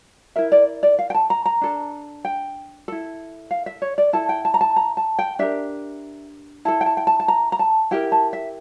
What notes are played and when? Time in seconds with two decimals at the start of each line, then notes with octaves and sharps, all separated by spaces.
0.36 E4 A#4 E5
0.52 D5
0.83 D5
0.99 F5
1.10 G5
1.14 A5
1.30 A#5
1.46 A#5
1.61 D4 A4
2.25 G5
2.88 E4 A4
3.51 F5
3.66 E5
3.82 C#5
3.98 D5
4.13 E4 A4 A5
4.29 G5
4.45 A5
4.54 A#5
4.61 A5
4.76 A#5
4.97 A5
5.19 G5
5.39 D4 G4 A#4 E5
6.65 E4 A4 A5
6.81 G5
6.86 A5
6.97 G5
7.07 A5
7.20 A5
7.28 A#5
7.52 A#5
7.59 A5
7.91 E4 G4 A#4 G5
8.12 A5
8.33 E5